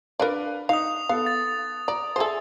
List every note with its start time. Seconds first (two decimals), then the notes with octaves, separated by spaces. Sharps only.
0.20 D4 A#4 B4 D5 F5
0.69 D#4 F5 D#6 F7
1.09 B3 A4 F5
1.26 A6
1.88 D5 A#5
2.16 G#4 A4 C5 E5 G#5